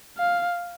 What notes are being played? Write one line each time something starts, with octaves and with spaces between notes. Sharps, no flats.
F5